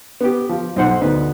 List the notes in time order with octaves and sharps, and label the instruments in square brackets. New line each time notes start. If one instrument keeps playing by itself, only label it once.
[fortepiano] B3 G4
F3
B1 D#4 C5 F#5 C6
D2 B3 D#4 B4